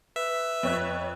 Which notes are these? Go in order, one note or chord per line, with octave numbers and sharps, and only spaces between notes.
B4 E5
F2 C#5 F#6